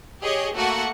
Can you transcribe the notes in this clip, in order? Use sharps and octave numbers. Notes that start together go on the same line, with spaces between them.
G4 G#4 C#5 D#5
A3 A#3 F#4 F#5 C#6